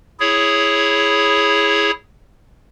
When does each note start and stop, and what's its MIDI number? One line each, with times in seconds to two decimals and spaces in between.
0.20 1.91 64
0.20 1.91 68
0.20 1.91 73